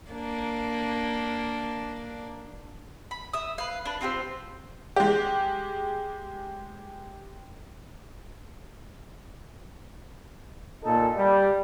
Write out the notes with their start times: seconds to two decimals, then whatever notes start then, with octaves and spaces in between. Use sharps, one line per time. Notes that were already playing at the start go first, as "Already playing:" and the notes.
0.11 A#3 D4
3.11 B5
3.33 E5 D#6
3.58 B4 F5
3.86 D4 B4
4.01 C4 F4 G4 C5
4.96 G#3 G4
10.83 A#2 D#4 A4
11.16 G3